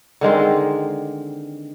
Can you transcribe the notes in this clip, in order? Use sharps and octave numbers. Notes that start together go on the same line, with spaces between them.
D3 D#3 G#3 C4